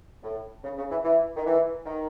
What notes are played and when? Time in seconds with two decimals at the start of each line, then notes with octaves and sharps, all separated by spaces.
0.23 A2
0.64 C#3
0.78 C#3
0.91 E3
1.05 E3
1.37 D#3
1.46 E3
1.86 D#3